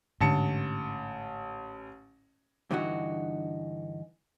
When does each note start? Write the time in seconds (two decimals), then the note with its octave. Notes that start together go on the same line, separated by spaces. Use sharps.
0.21 A1 G#2 D3 A5 C#7
2.71 G2 D3 E3 D#4 F#4